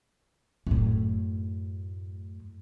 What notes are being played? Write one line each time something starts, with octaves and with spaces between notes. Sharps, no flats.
F#2 A2